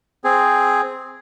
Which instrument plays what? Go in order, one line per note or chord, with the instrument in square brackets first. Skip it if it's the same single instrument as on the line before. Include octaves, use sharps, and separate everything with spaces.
[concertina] C4 G#4